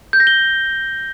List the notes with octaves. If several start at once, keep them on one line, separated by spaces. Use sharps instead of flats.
G6
A#6
G7